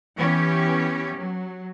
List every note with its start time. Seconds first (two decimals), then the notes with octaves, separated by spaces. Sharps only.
0.16 E3 B3 C#4 G4
1.17 F#3